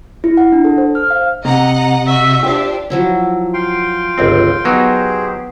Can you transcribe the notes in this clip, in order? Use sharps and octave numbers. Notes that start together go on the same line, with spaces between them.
E4
F#5
D4
A4
C5
F6
F5
C3 D#5 F#5 A#5
F#4 D#5 E5
D4 F4 G4 C5
F3 F#3 E4
F5 G5 C6
G1 C#2 C4
F#3 B3 D#4 G4 G#4 C5